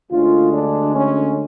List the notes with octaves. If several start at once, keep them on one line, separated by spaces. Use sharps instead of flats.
D2 D3 G#3 C#4 F4
D4
C#4